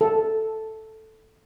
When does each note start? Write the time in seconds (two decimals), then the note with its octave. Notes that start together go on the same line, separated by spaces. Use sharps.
0.01 A4